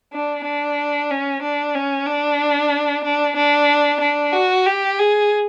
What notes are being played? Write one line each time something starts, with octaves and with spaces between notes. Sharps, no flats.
D4
D4
C#4
D4
C#4
D4
D4
D4
D4
F#4
G4
G#4